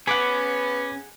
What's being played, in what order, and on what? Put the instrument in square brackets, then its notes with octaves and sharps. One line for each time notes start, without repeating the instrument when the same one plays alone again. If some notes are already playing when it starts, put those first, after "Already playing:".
[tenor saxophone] B3 [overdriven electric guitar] C#4 [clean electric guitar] G#4 F#5 [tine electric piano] B5 D6 B6